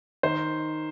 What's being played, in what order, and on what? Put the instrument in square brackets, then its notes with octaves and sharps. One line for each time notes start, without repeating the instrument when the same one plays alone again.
[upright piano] D#3 C5